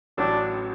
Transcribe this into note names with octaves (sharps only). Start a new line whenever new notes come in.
A1 A2 F#3 D4